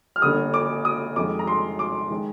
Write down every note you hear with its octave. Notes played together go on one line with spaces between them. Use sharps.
F6
G1 G2 D3 G3 A#3 D#6
D6
D#6
F2 D#3 G#3 D6
A#5
C6
D6
D#3 G#3